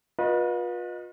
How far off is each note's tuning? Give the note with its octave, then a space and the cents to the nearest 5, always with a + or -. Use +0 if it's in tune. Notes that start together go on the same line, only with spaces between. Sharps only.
F4 +35 B4 -35 D#5 -10